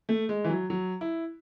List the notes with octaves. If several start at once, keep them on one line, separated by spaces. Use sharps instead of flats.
A3
G#3
E3
F#3
F#3
E4